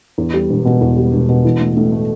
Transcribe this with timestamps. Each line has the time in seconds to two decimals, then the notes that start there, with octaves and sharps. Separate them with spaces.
0.18 E2
0.34 G3
0.50 E1
0.65 B2
0.81 E2
0.96 G3
1.13 E1
1.29 B2
1.45 E3
1.61 A2
1.77 A2
1.92 A3